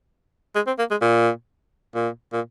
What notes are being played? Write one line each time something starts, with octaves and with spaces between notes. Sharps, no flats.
G#3
C4
A#3
G#3
A#2
A#2
A#2